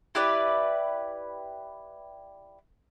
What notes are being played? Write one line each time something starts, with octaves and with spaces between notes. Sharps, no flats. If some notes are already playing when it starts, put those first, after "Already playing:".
E4 G4 B4 D5